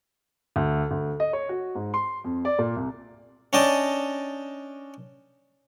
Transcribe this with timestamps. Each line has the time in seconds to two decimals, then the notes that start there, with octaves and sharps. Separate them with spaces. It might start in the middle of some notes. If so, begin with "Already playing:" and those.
0.56 D2
0.91 D2
1.20 D#5
1.33 C#5
1.49 F#4
1.75 G#2
1.94 C6
2.24 F2
2.45 D5
2.59 A#2
2.76 C2
3.53 C#4 D4 D#5 G5 A5